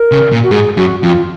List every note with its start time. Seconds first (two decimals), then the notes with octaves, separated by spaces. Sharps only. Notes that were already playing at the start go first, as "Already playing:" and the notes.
Already playing: A#4
0.12 C#3
0.32 A#2
0.43 F#4
0.51 G#2 G#4
0.77 F#2 F#4
1.03 F2 F4